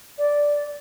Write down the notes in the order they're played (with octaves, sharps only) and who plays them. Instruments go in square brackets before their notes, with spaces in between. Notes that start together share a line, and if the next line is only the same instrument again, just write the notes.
[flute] D5